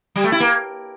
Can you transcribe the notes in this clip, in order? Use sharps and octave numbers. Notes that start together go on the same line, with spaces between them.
G3
A3
E4
A#3